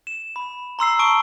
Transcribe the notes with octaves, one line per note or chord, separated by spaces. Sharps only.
E7
B5
A#5 C6 E6 C7
A5 C6 C#6 D#6 D7 G7